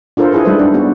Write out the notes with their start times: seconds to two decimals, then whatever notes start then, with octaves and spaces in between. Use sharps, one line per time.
0.17 D4 F4 A4 A#4 C5
0.32 E4 G#4 B4
0.45 G3 G#3 D#4 A4 B4 C5
0.59 D4
0.74 B3 F#4